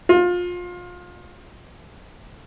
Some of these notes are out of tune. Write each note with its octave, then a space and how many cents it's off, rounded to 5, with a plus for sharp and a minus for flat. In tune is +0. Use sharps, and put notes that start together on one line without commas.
F4 +25